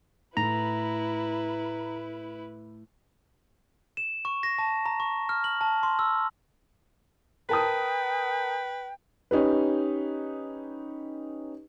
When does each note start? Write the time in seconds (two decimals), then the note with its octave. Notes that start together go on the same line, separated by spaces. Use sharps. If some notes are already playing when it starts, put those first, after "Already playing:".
0.37 A2 E4 B4 A#5
3.97 E7
4.25 C#6
4.43 A#6
4.58 A5
4.86 A#5
5.00 C#6
5.29 F6
5.44 F#7
5.61 A5
5.83 C6
5.99 E6
7.49 A#4 B4 G5 A5 D#6
9.31 C#4 D#4 G4 B4